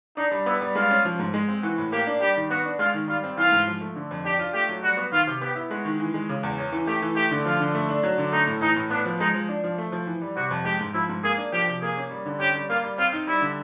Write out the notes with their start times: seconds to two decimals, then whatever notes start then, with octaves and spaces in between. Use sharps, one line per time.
0.17 D4 D#4
0.32 G3
0.46 B3 E4
0.61 G3
0.75 G#3 F4
0.91 C#4
1.05 F3
1.19 G#2
1.34 G#3
1.48 C4
1.63 E3 F#4
1.78 A2
1.92 A#3 G4
2.07 D4
2.21 G3 G4
2.36 D#3
2.50 B3 F#4
2.65 D4
2.79 G#3 F4
2.94 D#3
3.08 G3 F4
3.24 C4
3.37 E3 F4
3.52 G#2
3.67 F3
3.81 A3
3.96 D3
4.11 F2
4.25 D4 G4
4.39 F4
4.54 A3 G4
4.69 F#3
4.83 G3 F#4
4.97 B3
5.12 D#3 F4
5.27 C3
5.41 B3 G4
5.55 E4
5.70 G#3 F#4
5.85 D#3
6.00 E3
6.14 G#3
6.29 C#3
6.43 E2
6.58 C#4
6.72 E3
6.87 A3 G4
7.02 E3
7.16 A3 G4
7.31 D3
7.45 F3 F4
7.60 D3
7.75 A3
7.89 D4
8.03 F#3
8.18 D3
8.32 A3 D#4
8.47 A2
8.61 E3 D#4
8.76 A2
8.90 B3 D4
9.05 F3
9.20 G#3 D#4
9.34 F3
9.49 D4
9.64 F3
9.78 A3
9.92 F3
10.07 E3
10.22 G3
10.36 C3 F#4
10.51 F2
10.65 G#3 G4
10.81 G#2
10.94 F3 E4
11.09 G#2
11.24 A#3 G#4
11.38 D4
11.53 F3 G4
11.67 C3
11.82 A#3 G#4
11.97 C#4
12.11 G3
12.26 D3
12.40 C#4 G4
12.55 G3
12.69 A#3 F4
12.83 G3
12.98 C4 F4
13.13 D#4
13.27 G3 E4
13.41 D3